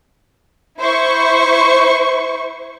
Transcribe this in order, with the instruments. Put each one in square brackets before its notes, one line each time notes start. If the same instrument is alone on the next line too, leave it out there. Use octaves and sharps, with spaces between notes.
[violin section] E4 C5 C#6